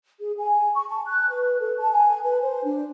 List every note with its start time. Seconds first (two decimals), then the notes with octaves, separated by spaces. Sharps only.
0.20 G#4
0.37 G#5
0.74 C#6
0.89 A5
1.07 F#6
1.29 B4
1.60 A4
1.79 A5
1.92 G#5
2.23 B4
2.42 C5
2.64 D4